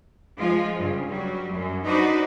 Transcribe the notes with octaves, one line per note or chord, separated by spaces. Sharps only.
F3 G#3 F4
G2 C#3
F#3 G3
F#2
D4 D#4 F#4 B4 C5 D5